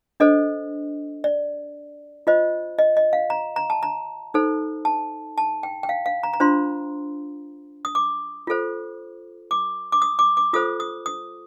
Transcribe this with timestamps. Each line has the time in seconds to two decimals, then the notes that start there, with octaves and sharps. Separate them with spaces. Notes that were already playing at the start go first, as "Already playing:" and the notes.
0.20 D4 A4 C5 D#5
1.24 D5
2.27 F4 C5 D#5
2.78 D#5
2.97 D#5
3.13 F5
3.30 A#5
3.56 A#5
3.70 A5
3.83 A#5
4.34 D#4 A4 C5
4.85 A5
5.38 A5
5.63 G5
5.83 G5
5.89 F5
6.06 F5
6.23 A#5
6.34 A#5
6.40 D4 F4 C5 C6
7.85 D#6
7.95 D6
8.47 F4 A4 C5
9.51 D6
9.92 D6
10.02 D#6
10.19 D6
10.37 D6
10.53 F4 A4 C5 D#6
10.80 D#6
11.06 D#6